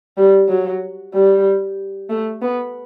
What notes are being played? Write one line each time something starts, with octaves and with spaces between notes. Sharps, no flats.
G3
F#3
G3
A3
B3